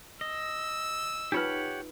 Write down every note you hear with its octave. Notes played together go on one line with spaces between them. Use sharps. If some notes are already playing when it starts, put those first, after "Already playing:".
D#5 E6
D#4 F4 G4 B4 C#5 F#5